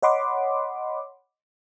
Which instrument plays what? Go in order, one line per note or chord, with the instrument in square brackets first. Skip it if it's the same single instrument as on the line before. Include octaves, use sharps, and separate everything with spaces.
[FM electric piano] C#5 D#5 F#5 B5 C6 D6